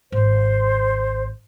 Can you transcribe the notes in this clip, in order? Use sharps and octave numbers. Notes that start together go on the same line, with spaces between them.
G#1 C5